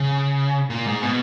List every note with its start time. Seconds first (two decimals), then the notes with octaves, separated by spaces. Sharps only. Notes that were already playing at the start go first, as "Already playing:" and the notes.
Already playing: C#3
0.70 A#2
0.86 G#2
1.03 B2